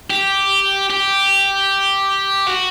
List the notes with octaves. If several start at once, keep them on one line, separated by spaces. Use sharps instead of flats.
G4
G4
F#4